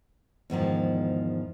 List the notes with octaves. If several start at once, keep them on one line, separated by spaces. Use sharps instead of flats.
E2 G#2 D#3 F3